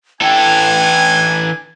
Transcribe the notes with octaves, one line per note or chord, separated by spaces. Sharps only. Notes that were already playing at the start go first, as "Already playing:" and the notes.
E3 D4 A4 G5 G#5